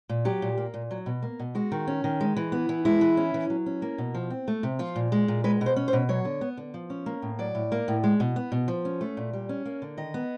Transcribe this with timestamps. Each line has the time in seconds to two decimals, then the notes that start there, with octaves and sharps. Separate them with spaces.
0.09 A#2
0.25 F#3 G4
0.42 A#2
0.58 A#3
0.74 A#2
0.91 F#3
1.06 B2
1.23 A#3
1.40 B2
1.55 G#3 F#4
1.72 D#3
1.87 C#4
2.04 D#3
2.21 G#3
2.37 E3
2.52 B3
2.69 E3
2.85 G#3 E4
3.01 E3
3.17 C#4
3.34 E3
3.50 F#3
3.66 C#4
3.82 A#3
3.98 B2
4.15 F3
4.30 C4
4.48 A3
4.63 C3
4.79 F3 F4
4.96 A#2
5.12 G#3
5.28 A#2
5.44 G#3 B4
5.61 B2
5.66 C5
5.76 C#4
5.88 C5
5.93 B2
6.09 F#3 C#5
6.25 D3
6.41 B3
6.57 D3
6.74 F3
6.90 C#4
7.06 A#3
7.22 A2
7.39 F#3 D5
7.55 A2
7.72 A#3
7.88 A2
8.04 G#3
8.20 B2
8.36 B3
8.52 B2
8.68 F3
8.85 C#4
9.01 A3
9.17 A#2
9.33 G3
9.49 C#4
9.66 A#3
9.82 D3
9.97 D#3 D#5
10.14 B3